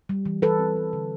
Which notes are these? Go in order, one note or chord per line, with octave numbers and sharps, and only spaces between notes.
G3
E3
E3 A4 B4
C4
G3
D3